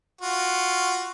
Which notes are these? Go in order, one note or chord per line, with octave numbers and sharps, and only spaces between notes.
F4 F#4